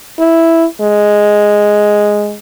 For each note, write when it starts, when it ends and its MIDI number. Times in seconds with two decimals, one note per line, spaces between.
0.19 0.65 64
0.81 2.36 56